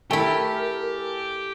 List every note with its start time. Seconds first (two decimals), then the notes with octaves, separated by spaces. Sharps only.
0.11 A3 E4 G4 A4 A#4 G#5